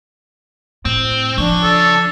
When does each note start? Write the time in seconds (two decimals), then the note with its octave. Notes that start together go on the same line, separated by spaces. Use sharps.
0.85 A2 C4
1.38 C#3 F3 D4 C#5
1.64 A4